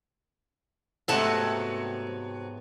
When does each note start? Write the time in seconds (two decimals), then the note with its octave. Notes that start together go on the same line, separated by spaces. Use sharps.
1.08 G#2 C3 F#3 A3 B3 E4 F#5 A5